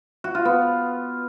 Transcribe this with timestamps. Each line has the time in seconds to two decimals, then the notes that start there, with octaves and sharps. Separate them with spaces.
0.24 F#4
0.35 F4
0.45 B3